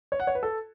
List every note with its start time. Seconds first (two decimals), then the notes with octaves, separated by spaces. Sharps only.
0.12 C#5
0.20 F#5
0.27 C#5
0.35 B4
0.43 A4